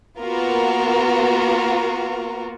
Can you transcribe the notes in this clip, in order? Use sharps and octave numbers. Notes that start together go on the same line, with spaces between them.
A#3 B3 F4 F#4 A#4